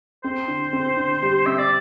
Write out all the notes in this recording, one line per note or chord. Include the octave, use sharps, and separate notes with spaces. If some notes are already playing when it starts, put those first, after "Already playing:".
C4 C5
D3
C4
D3
G3
C4 E5
D5